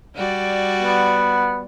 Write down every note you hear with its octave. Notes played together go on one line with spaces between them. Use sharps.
G3 F#4 D5
B3